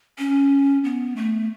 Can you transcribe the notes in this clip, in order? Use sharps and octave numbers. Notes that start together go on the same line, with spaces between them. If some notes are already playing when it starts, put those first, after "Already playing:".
C#4
B3
A3